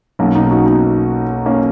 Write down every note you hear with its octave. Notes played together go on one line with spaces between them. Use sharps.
B1 B2 A#3 C#4
B3 D#4
D#4 F#4
B3 D#4
A#3 C#4